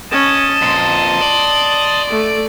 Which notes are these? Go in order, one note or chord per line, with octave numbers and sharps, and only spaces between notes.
C#4 D#5 A5 D#6 E7
F2 A#2 C6
D5 F#7
A3